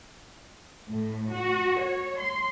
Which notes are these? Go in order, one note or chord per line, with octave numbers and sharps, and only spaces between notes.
A2
F#4
C#5
C6